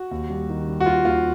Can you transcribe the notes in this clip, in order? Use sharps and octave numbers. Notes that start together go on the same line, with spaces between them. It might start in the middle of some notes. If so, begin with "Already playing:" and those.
Already playing: F#4
D#2
G3
D#3
G3
F#4
D#2 F4
D#2 F4